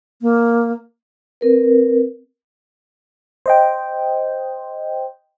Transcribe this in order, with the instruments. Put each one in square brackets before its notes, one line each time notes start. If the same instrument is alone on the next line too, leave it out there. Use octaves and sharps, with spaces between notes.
[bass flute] A#3
[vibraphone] C4 A#4 B4
[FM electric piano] C5 D#5 G5